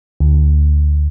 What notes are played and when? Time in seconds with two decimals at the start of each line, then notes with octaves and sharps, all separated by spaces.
0.20 D2